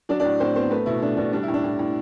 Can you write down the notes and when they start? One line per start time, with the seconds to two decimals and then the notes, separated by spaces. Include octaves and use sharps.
0.09 F#3 D4 D5
0.20 D4 D5
0.25 A2
0.40 A2 C4 C5
0.56 B3 C4 C5
0.71 A3 B3 B4
0.86 B2 E4
1.02 A3 D4
1.17 B2 D4
1.32 G3 D4
1.43 E4
1.48 A2
1.54 D4
1.64 A2
1.79 A2